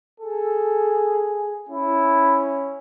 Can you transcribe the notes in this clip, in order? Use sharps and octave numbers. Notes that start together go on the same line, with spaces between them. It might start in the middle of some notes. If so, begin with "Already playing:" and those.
G#4 A4
C#4 E4